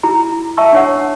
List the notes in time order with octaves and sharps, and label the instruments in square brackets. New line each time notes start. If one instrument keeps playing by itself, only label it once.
[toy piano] E4 G#4 A#5
E5 A5 C#6 E6
D4 C#5 F#5